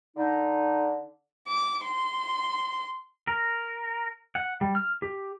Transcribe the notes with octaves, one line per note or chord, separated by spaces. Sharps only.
D3 D#4
D6
C6
A#4
F#5
G3
F6
G4